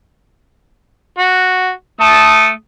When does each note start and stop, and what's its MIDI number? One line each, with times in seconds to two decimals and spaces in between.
1.18 1.72 66
2.01 2.50 57
2.01 2.50 81
2.01 2.50 87